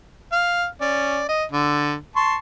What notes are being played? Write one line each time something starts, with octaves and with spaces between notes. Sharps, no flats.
F5
C#4 D5
D#5
D3
A5 C6 C#6